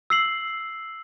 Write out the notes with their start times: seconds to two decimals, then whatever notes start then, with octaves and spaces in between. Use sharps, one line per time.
0.10 E6 C7 F#7